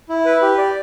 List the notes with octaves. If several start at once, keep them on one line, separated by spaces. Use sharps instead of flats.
E4
B4
G4
D5